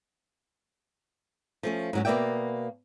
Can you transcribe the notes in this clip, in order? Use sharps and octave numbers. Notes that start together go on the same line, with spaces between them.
F3 A3 C#4
G#2 F#3 C#4
B2 A#3 A4 D5 E5 G5